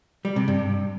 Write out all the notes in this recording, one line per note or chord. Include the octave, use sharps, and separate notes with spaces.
G3
C3
G2